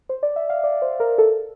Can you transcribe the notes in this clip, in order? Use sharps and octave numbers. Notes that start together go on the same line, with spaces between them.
C5
D5
E5
F5
D5
C5
A#4
A4